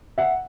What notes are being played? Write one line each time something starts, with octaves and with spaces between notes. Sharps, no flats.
E5 F#5